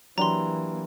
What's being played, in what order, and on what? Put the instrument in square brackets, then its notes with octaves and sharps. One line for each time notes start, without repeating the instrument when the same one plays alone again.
[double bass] E3 A#3 [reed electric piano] F#3 D4 G4 [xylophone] A#5 C6